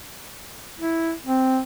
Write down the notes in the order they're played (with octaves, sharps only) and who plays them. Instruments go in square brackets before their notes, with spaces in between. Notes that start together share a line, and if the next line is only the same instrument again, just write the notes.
[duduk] E4
C4